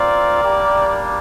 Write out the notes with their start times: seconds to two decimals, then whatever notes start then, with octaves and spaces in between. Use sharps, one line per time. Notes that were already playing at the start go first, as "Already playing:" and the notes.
Already playing: C4 F4 A#4 D5
0.42 G3 A#3 D4 G4